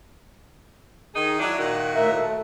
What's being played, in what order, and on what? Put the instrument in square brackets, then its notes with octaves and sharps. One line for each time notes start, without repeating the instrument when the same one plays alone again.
[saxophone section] D#3 D#4 G#4
F#3 D4 E4
A#2 D#3 F#4
[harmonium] A2 A#4 E5
A3